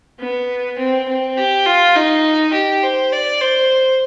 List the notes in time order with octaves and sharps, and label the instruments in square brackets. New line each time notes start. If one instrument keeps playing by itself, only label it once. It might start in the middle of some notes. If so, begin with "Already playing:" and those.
[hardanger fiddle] B3
C4
C4
G4
F4
D#4
G4
C5
D5
C5